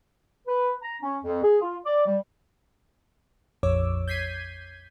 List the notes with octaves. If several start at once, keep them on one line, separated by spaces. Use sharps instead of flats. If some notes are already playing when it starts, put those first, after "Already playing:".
B4
A#5
C#4
F2
G#4
F4
D5
G3
A#1 F2 C#5 D6 E6
G6 G#6 B6 C7 D#7